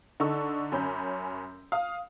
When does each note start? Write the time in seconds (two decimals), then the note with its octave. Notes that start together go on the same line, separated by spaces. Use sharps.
0.20 D3 D#4 A4 C#6 E6
0.72 F#2 C#4 B5 G6
1.72 F5 D#6